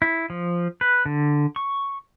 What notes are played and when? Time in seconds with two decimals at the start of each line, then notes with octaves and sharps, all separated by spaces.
0.02 E4
0.30 F3
0.81 B4
1.06 D3
1.56 C#6